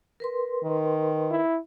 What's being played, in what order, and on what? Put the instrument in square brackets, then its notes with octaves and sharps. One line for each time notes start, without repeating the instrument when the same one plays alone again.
[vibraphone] A#4 B4 C6
[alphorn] D#3
[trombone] E4